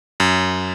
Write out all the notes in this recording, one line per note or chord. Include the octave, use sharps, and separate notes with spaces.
F#2